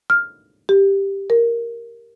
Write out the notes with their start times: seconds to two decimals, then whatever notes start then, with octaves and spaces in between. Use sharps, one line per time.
0.10 F6
0.69 G4
1.30 A#4